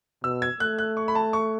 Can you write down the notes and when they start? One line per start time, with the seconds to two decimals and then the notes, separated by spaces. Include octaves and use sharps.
0.24 B2 E6
0.42 G#6
0.60 A3 F#6
0.78 F#6
0.97 C#6
1.08 B5
1.15 A5
1.33 C#6